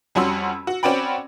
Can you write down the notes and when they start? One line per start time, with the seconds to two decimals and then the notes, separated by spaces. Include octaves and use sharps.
0.15 F2 G3 C#4 F#4 C6 E6
0.67 F#4
0.83 C4 C#4 F#4 D5 G5 B5